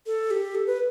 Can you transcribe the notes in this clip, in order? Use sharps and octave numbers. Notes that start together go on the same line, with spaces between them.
A4
G4
A4
B4